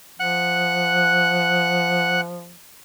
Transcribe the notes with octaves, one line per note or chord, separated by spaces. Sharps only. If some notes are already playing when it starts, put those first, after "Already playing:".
F3 F#5 F#6